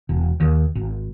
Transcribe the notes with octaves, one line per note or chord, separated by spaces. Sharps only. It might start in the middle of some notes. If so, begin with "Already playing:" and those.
E1
D#2
G#1